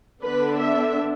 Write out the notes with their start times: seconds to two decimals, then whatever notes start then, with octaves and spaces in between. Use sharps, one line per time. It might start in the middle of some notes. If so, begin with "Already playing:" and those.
0.22 D3 B3 D4 B4
0.57 E5